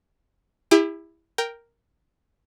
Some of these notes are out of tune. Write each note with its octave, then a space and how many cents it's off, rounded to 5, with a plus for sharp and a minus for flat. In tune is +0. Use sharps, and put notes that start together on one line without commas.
E4 +0 G4 +45
A#4 +0 G5 +0